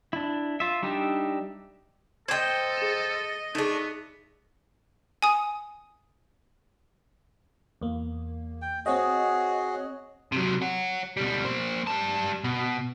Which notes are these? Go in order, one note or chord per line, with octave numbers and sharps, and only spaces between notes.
D4 E4
F4 E5
G3 D4 D#4 G4 E5
A4 C5 D#5 G5 G#6
G#4 E7
A3 B3 D4 D#4 G#4
G#5 D#6
E2 A#3
G5
C4 F#4 G#4 C#5 D#5
C3 F#3
C#5 F#5
B2 G3
A#3 C5
G3 A5
B2